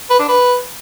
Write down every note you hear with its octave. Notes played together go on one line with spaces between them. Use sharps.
B4
D4
B4